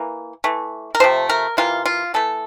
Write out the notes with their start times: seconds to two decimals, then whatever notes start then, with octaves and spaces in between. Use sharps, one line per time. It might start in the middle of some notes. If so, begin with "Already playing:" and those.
Already playing: E3 A#3
0.44 E3 A3
0.95 A#4
1.00 C3 F3 A3 C5
1.29 A#4
1.57 C3 E3 A#3 F4
1.85 F4
2.14 E3 A3 A4